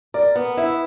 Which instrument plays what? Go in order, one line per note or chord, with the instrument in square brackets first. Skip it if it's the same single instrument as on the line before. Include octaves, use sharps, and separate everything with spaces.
[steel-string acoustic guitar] A#4 [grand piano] D5
[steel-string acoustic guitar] B3
[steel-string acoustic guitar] E4 [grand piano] E5